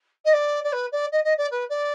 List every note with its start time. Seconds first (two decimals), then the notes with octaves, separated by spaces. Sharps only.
0.25 D#5
0.33 D5
0.63 D5
0.72 B4
0.92 D5
1.12 D#5
1.24 D#5
1.37 D5
1.51 B4
1.69 D5